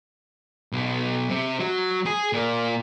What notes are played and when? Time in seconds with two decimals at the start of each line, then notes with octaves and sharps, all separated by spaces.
0.72 B1
1.30 C3
1.60 F#3
2.06 G#4
2.33 A#2